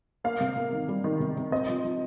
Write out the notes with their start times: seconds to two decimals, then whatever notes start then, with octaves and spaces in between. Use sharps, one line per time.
0.24 A#3 F5
0.40 C3
0.56 A#3
0.72 D#3
0.89 G3
1.04 D#3
1.20 C3
1.37 C3
1.52 C4 D#5
1.68 F3
1.84 F3